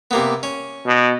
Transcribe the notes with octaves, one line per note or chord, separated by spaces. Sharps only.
C3 A#3 B3
C#4
B2